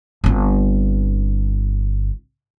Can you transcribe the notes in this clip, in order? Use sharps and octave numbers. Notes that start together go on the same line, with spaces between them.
G1 C4